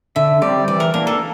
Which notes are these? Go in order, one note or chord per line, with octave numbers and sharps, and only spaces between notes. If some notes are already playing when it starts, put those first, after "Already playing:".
D3 E5
G3 C4 G4 D5
E3 D5
A#4
A#3 D4 A#4
A4